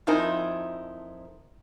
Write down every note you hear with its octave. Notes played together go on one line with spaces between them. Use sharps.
F2 F3 D#4 E4 A#4 G#5